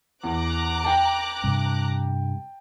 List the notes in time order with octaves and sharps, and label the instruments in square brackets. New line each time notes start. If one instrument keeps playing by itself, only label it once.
[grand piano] E2 [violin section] A#5 D6 F#6
[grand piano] G5 A5
[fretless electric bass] G2 C3